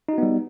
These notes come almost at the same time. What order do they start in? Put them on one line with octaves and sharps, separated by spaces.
D#4 F#4 B3 G3